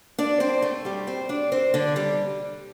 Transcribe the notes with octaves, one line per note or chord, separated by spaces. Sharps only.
D4 D5
C4 C5
A3 A4
G3 G4
C4 C5
D4 D5
C4 C5
D3 D4
G3 G4